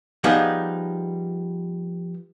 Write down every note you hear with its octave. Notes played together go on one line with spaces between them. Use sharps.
F3 G3 B3 D#4 G#4